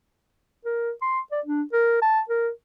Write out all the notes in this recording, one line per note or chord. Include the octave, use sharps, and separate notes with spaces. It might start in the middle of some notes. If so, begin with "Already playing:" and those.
A#4
C6
D5
D4
A#4
A5
A#4